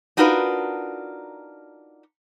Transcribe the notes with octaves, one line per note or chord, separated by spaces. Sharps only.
D4 D#4 F4 F#4 A#4 B4